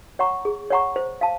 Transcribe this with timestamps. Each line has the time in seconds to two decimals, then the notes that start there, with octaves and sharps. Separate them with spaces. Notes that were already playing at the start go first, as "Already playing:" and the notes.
0.19 C#5 F#5 A#5 C#6
0.45 G#4
0.70 C#5 F#5 A#5 C#6
0.96 C5
1.21 F5 A5